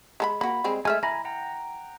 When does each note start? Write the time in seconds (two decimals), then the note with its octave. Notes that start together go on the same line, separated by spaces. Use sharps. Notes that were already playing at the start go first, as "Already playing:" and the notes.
0.20 G#3 A4 B5
0.41 A#3 F#4 B5
0.64 G3 G#3 C4
0.85 G#3 A3 E5 G#5 F6
1.03 E3 G#5 A#5 B5
1.25 F#5 G5 A#5